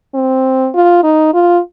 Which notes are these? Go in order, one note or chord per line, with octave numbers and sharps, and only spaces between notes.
C4
F4
D#4
F4